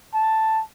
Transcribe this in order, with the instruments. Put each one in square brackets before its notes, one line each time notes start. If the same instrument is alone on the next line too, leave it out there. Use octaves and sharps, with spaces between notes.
[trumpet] A5